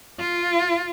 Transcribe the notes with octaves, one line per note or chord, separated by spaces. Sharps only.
F4